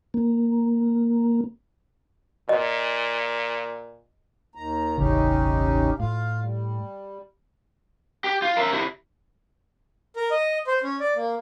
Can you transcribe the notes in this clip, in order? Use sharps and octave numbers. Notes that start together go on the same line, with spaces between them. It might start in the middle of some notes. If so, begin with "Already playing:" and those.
A#3
A#2 D#5
D#2 D#3 A#5
E1 A1 C#3 C#4 D#4 G4
A2 F4 F5
G3
G4
F4
A#4 E5
C3 E4
A#4
D#5
C5
C#4
D5
A#3